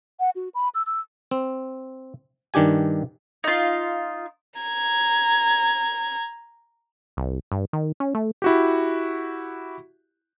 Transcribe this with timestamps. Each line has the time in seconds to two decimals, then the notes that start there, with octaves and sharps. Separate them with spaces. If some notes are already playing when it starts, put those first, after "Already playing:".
0.20 F#5
0.36 F#4
0.55 B5
0.75 E6
0.86 E6
1.31 C4
2.54 G2 D#3 D4 G4 G#5
3.44 D#4 F4
4.60 A#5 G#6
7.17 C2
7.52 G2
7.73 D#3
8.00 C#4
8.15 A3
8.42 E4 F#4 G4